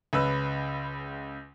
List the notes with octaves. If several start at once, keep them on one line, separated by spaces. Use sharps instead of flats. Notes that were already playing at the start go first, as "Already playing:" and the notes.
C#2 C#3 B4 E6